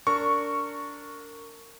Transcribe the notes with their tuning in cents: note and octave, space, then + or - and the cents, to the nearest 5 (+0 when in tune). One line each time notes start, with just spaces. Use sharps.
D4 -20 A#4 -25 C#6 +0